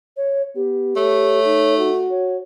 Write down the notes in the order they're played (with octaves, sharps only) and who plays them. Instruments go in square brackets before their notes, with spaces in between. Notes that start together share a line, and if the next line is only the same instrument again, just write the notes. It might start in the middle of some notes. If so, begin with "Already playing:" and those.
[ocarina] C#5
[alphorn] B3 [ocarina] G4
[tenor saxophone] A3 [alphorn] C#5
[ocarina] D#4
[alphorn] F#4
[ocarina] C#5